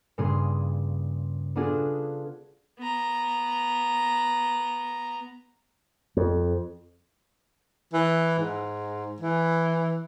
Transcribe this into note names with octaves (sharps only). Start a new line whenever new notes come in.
G2 A#2 C#3 G#4 C6 D#7
B3 D4 F4 F#4 G#4 A4
B3 A#5
F2
E3
G#2
E3